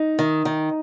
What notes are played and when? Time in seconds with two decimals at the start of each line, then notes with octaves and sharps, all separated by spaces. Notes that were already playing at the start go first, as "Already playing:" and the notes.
Already playing: D#4
0.19 D#3
0.45 D#3